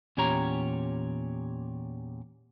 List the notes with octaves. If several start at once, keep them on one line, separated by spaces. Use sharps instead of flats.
E2 A#2 C#4 G4 C#5 A#5